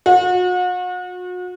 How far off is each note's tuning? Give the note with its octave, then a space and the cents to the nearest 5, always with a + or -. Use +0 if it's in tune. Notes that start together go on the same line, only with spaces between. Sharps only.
F#4 -40